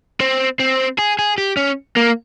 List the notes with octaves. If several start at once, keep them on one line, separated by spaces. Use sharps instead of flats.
C4
C4
G#4
G#4
G4
C#4
A#3